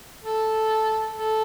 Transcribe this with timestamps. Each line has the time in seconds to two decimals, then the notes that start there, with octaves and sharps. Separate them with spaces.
0.24 A4
1.18 A4